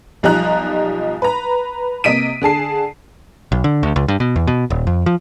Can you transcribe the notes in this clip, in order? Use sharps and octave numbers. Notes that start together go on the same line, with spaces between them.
B1 F3 G3 D#4 A#5 F#6
B4 A#5
C3 A#3 D#5 B6 D7 D#7
D3 G#4 A5 C7
B1
D3
D2
C#2
G2
B2
E2
B2
D#1
F2
F3